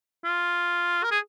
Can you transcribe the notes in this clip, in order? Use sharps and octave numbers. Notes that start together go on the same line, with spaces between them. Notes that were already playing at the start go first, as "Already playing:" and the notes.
F4
A#4
G#4